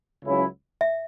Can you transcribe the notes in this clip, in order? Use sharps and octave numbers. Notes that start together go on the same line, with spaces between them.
C#2 C#3 F#3 C#4 E4
E5